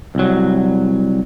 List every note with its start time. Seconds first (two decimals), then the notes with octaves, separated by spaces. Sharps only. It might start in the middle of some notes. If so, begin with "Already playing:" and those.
0.15 C2 F#3